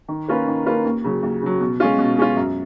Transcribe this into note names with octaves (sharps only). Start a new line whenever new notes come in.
D#3
A#3 C#4 F4 B4
D#3
A#3 C#4 F4 B4
D#2
C#3 F#3
D#2
C#3 F#3
B2
G#3 C#4 F4
B2
G#3 C#4 F4
F#2